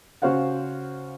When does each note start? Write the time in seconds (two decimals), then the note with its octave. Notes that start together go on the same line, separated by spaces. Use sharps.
0.22 C#3 F#4 C5 F5 F#5